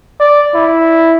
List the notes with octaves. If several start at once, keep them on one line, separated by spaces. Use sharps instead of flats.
D5
E4